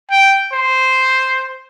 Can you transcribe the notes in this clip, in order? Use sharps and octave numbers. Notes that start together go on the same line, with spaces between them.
G5
C5